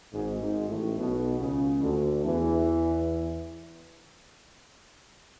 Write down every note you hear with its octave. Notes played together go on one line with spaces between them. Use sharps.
G#1 G#2
G#1 G#2
A1 A2
B1 B2
C#2 C#3
D2 D3
E2 E3